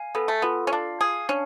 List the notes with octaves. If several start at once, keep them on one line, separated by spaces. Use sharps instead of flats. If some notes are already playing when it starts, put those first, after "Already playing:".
Already playing: F5 G#5
B3 A4
A3
B3 F4
C#4
D4 F5
G#4 F5
C#4 D4